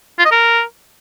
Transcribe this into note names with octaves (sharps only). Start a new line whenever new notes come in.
F4
D#5
A#4